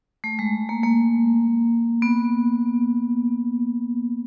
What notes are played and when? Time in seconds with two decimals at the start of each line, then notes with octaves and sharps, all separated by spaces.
0.24 A3
0.39 G#3
0.69 A#3
0.83 A#3
2.02 B3